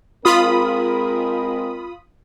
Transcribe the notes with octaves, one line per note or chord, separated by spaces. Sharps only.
G#3 C4 F4 A#4 B5 D#6